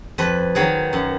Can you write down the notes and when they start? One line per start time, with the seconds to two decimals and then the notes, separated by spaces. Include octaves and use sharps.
0.18 F2 B4
0.55 D#3 F#3 G#4
0.93 F#2